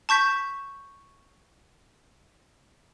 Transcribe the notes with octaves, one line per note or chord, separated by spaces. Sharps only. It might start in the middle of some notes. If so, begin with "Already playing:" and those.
A5 C#6 G6 B6